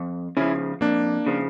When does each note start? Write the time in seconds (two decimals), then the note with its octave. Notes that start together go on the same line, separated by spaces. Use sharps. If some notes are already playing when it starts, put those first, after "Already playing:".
Already playing: F2
0.37 C#3 F3 C#4 E4
0.81 F2 A#3 D4
1.26 C#3 F3